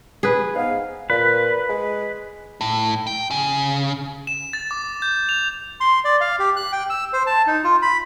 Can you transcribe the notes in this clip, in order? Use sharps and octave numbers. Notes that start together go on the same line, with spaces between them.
G#4 B4
G#2 B3 F5
A#2 B4
G#3
A2
G5
C#3
E7
A6
D6
G6
F7
C6
D5
F5
G4
F#6
G5
E6
C5
A5
D#4
F4
B5